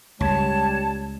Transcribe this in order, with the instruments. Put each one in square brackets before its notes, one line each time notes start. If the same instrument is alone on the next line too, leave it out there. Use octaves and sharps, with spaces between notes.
[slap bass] C#2 [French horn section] G3 [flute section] C#5 A5